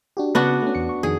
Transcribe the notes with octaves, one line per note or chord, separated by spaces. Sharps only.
D4 F#4 G4
C#3 B3 D4 F#4
A3 C#4
E2 C#7
C#6
F2 D#3 G#4